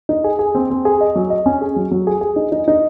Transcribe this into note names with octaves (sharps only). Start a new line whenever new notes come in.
D#4
G#4
G#4
C4
C4
G#4
D#5
F#3
D#5
C#4
G#4
F#3
F#3
G#4
G#4
D#4
D#4
D#4